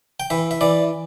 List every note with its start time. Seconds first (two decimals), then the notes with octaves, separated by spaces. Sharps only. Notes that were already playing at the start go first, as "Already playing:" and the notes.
0.20 G5
0.30 E3 E5
0.51 E5
0.61 E3 D5